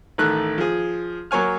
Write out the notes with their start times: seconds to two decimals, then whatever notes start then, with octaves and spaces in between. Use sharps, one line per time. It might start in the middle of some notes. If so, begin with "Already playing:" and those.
0.18 A1 D#3 A3 F#6
0.58 F3 G#4
1.31 F#3 A#3 C#5 G#5 F6